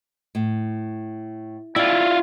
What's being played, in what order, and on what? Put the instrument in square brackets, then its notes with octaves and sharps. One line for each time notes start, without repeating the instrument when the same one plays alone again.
[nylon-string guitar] A2
[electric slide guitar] E4 F4 [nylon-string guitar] D5 G5